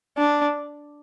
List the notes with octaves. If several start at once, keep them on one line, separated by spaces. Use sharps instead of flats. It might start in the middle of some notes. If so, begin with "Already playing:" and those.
D4